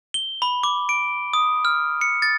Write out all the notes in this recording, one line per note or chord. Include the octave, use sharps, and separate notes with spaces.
G7
B5
D6
D7
D#6
F6
C#7
A6